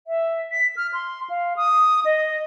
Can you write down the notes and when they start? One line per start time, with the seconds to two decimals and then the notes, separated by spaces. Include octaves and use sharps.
0.07 E5
0.52 B6
0.77 F6
0.93 C6
1.30 F5
1.57 D#6
2.05 D#5